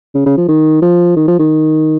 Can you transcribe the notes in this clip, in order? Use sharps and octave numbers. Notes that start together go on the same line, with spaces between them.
C#3
C#3
F3
D#3
F3
D#3
F3
D#3